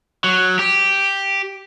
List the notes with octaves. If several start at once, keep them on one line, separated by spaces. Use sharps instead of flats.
F#3
G4